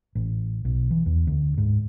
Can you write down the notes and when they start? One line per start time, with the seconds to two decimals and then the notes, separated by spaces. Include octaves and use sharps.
0.15 A1
0.65 B1
0.91 E3
1.06 E2
1.27 D2
1.58 G#2